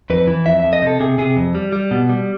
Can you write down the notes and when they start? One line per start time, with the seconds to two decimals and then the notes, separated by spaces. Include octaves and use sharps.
0.10 F2 B4
0.27 E3
0.46 F2 E5
0.60 F2 E5
0.73 D#5
0.82 C3 A4
1.00 C3 G#4
1.18 C3 G#4
1.37 F2
1.55 G3
1.72 G3
1.91 B2
2.09 G3